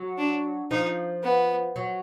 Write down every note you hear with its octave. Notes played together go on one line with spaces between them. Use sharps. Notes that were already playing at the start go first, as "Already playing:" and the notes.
Already playing: F#3
D4
F3 D#4
B3
F#3